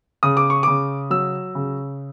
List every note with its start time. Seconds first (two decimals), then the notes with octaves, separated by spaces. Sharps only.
0.23 C#3 D#6
0.37 D6
0.50 C#6
0.63 C#3 D6
1.10 F#3 E6
1.55 C#3